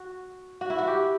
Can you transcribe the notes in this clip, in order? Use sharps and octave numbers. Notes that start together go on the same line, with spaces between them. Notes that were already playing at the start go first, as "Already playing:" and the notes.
Already playing: F#4
F#4
E4
F#4
G4